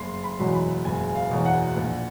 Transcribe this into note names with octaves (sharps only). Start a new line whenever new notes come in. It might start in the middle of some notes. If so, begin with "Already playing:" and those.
Already playing: F#1 C6
B5
E2 B2 F#3
B5
F#1 G#5
F5
E2 B2 F#3
F#5
A#1